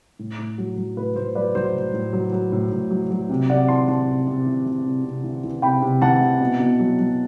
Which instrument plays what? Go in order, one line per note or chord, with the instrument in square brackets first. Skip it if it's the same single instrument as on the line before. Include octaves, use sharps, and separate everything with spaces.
[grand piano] A2
A2
F#3
F#3
A2 B4
A2 C5
F#3 B4 D5
F#3 C5
A2
A2
F#3
F#3
A2
A2
F#3
F#3
C3
C3 D5 F#5
E3 A5 C6
E3 A5 C6
C3
C3
E3
E3
C3
C3
E3
E3
C3 G5 B5
C3
E3 F#5 A5
E3
B2
B2
F#3
F#3